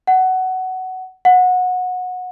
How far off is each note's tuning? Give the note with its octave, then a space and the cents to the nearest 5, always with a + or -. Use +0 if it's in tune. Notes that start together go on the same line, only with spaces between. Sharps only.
F#5 +15
F#5 -20